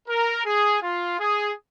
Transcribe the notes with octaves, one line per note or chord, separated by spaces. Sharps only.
A#4
G#4
F4
G#4